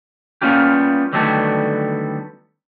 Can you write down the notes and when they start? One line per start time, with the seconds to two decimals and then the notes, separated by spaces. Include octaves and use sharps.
0.42 G3 A#3 B3 C#4 F4 G4
1.13 D3 D#3 F#3 G3 A3 B3